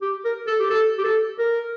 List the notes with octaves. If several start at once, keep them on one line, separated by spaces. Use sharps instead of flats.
G4
A#4
A4
G4
A4
G4
A4
A#4